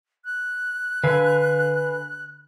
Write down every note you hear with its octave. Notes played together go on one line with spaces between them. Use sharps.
F#6
D3 B4 F5 G#5